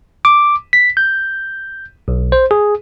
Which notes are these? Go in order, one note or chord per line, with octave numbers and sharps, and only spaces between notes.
D6
B6
G6
B1
C5
G#4